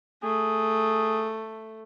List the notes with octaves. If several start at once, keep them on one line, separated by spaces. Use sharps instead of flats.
A3 G#4